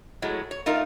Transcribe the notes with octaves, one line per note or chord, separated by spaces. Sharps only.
A2 F#3 G#3
C#5
A3 D#4 F4 A#4